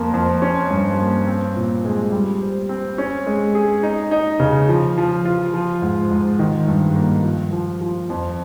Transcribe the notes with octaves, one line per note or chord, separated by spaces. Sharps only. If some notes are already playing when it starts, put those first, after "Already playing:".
Already playing: F2 A#3
F2
C#4
G2
A#3
C4
A#2
G#3
G3
C5
C4
C#4
G#3
G#4
D#4
D#4
C#3
F3
F3
F4
F3
G#2
G#2
D#3
G2
A#3
F3
F3
F3
F2